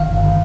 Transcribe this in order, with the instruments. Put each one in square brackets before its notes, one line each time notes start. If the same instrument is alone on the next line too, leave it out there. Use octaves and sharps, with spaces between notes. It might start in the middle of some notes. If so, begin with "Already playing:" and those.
Already playing: [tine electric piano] G1 D#3 F5
G2
D3